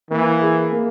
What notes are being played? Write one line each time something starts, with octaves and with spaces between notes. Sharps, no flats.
E3 A#3
G#4
A#3